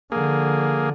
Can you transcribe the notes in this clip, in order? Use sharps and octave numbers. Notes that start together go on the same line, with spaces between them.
D3 F3 A#3 G#4